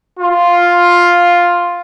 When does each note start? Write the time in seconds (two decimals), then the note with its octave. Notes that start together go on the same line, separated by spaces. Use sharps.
0.19 F4